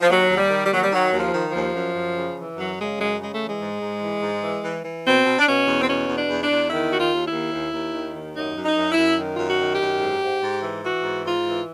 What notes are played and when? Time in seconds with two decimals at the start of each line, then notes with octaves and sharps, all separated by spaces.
0.01 F3
0.09 D#2 F#3
0.29 D#2
0.37 G3
0.50 D#3
0.65 G3
0.71 D#2 F#3
0.82 G3
0.92 D#3 F#3
1.13 D#2
1.19 F3
1.34 D#3
1.48 F3
1.54 D#2
1.74 F#2
1.95 F#2
2.16 C#3
2.37 E3
2.57 F#2 F#3
2.78 C#3 G#3
2.98 F#2 G#3
3.19 C#3 G#3
3.33 A3
3.40 E3 G#3
3.60 G#2
3.81 G#2
4.02 E3
4.22 G#2
4.42 E3
4.63 E3
4.84 E3
5.05 B2 C4
5.25 B2
5.38 D4
5.46 B2 C#4
5.66 E2
5.80 C4
5.87 B2 C#4
6.08 E2
6.15 D4
6.28 E2
6.43 D4
6.50 E2
6.70 D#3 E4
6.89 D#2 F#4
6.98 F4
7.11 D#2
7.25 E4
7.32 D#2
7.52 D#2
7.73 D#2
7.93 D#3
8.15 D#2
8.35 F#2 D#4
8.56 F#2
8.63 D#4
8.76 F#2
8.91 E4
8.97 F#2
9.18 D#3
9.34 F#2 F4
9.45 F#4
9.59 D#3
9.73 G4
9.80 F#2
10.00 G#2
10.21 G#2
10.42 G#2
10.62 E3
10.83 E3 F#4
11.03 G#2
11.24 G#2 F4
11.45 E3